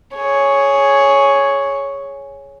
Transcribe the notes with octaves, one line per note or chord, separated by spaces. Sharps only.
G#4 C#5